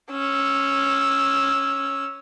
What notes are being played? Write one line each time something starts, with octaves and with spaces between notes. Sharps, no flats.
C#4 E6